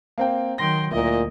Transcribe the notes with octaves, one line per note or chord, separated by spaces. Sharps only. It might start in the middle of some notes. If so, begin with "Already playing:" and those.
A#3 C4 G5
D#3 F#3 G5 C6 A#6
D2 A#2 E4 A#4 D#5